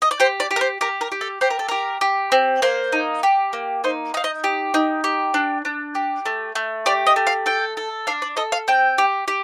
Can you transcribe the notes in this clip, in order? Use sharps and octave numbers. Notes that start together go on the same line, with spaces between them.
D#5
D5
G4 C5
D5
G4
A#4
C5
G4 A#4
A#4
G4
A4
G4 C5
A#4
A4
G4 A#4
G4
C4
A#3 C5
D#4
G4
A#3
D#4 C5
D#4 F5
D#5
G4
D#4
G4
D4
D4
G4
A3
A3
G4 D5
D#5
A3
F5
A4 G5
A4
D4 F5
D5
A4 D#5
F5
C4 G5
G4
G4